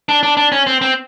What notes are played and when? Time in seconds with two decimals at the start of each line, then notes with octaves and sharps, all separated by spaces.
0.09 D4
0.23 D4
0.37 D4
0.52 C#4
0.67 C4
0.81 C4